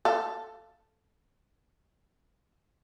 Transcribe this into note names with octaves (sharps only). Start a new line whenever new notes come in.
A4 F5